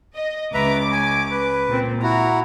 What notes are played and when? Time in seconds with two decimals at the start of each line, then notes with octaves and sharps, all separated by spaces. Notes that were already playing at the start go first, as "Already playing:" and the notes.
0.15 D#5
0.54 C#2 B4 E5 A#5 D6
0.92 G#5
1.31 B4
1.69 A#2 C4
2.03 E4 F#4 A#5